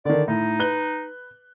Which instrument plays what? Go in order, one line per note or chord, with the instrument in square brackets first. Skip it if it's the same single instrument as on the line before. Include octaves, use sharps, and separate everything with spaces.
[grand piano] D3 D#3 [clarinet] D5
[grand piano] A2 [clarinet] D#4
[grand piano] B4 F#6 G7